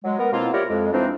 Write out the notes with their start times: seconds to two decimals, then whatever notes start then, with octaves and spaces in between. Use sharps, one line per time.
0.04 F#3 G#3
0.19 B3 A#4
0.33 B2 A#3 C4 E4 F4
0.53 E4 F4 G4 A#4 C#5 D5
0.69 F2 G#3
0.93 E3 F3 C4 D4 D#4